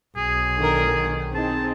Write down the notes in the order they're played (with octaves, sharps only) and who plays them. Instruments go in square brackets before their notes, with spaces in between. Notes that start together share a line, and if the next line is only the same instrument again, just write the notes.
[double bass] B1 [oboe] G#4
[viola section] D3 D#3 A#4
D#3
[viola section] C4 D#4 G#4 [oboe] A5